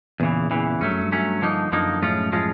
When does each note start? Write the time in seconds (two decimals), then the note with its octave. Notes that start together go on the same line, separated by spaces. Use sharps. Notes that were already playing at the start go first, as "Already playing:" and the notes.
0.20 E2 A#2 C#3 E3
0.51 E2 C#3 E3
0.81 G2 F#3 A3 C#4
0.91 F#2
1.01 G2
1.12 F#3 A3 C#4
1.42 D3 F3 A#3 D#4
1.72 F#2 D3 F3 A#3 D#4
2.02 A2 F3 G#3 C#4 F4
2.32 A2 F3 G#3 C#4 F4